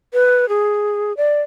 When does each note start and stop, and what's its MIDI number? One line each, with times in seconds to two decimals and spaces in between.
0.14 0.48 71
0.49 1.16 68
1.17 1.41 74